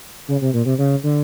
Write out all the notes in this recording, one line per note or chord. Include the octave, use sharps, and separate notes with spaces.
C#3
C3
A#2
C3
C#3
D3